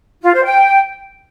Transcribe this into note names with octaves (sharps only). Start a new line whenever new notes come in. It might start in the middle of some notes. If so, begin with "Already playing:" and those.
F4
C5
G5